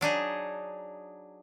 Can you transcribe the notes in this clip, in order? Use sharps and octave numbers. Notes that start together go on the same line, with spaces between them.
F#3 D4 D#4 G#4